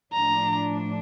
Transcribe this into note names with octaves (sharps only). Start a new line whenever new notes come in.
A2 F3 A3 D4 A#5